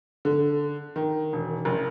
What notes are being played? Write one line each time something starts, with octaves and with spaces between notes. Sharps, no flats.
D3
D#3
E1
F#1